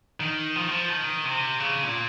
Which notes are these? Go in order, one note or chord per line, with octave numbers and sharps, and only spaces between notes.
D#3
F3
D#3
F3
D#3
C3
C#3
A#2